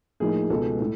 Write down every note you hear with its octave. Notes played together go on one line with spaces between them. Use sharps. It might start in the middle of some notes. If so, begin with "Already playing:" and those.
A2 F3 A#3 D#4 G#4
C#2 B2 G#3 B3 A4
A2